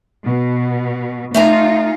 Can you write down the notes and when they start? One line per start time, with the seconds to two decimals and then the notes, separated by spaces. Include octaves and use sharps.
0.24 B2
1.34 A3 D#4 F4 G#5 A#5